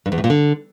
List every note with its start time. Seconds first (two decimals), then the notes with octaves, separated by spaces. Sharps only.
0.06 G2
0.12 E2
0.18 A2
0.24 A#2
0.30 D3